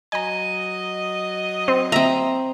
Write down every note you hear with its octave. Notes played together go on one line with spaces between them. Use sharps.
F#3 D#5 G#5 A#5
C4
C4 E5 A#5